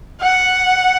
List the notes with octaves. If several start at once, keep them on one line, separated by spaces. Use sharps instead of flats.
F#5